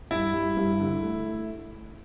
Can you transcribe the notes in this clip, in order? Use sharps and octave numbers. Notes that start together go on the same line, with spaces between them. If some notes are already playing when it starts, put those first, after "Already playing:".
G2 E4
G3
G2
D3
A3
A3